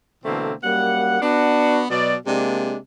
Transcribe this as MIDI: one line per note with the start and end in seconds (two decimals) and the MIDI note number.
0.24 0.53 47
0.24 0.53 50
0.24 0.53 52
0.24 0.53 57
0.24 0.53 58
0.24 0.53 60
0.64 1.20 42
0.64 1.20 55
0.64 1.20 58
0.64 1.20 78
1.22 1.84 59
1.22 1.84 62
1.22 1.84 66
1.90 2.15 47
1.90 2.15 54
1.90 2.15 74
2.26 2.76 48
2.26 2.76 56
2.26 2.76 58
2.26 2.76 62